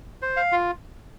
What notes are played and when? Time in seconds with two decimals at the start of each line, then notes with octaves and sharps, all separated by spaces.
0.22 C5
0.36 F5
0.52 F4